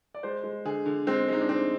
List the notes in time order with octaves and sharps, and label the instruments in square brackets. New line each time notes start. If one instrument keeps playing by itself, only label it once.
[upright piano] D5
G#3 C5
G#3
D3 G#4
D3
G#3 C4
G#3 D#4
D4
D3 C4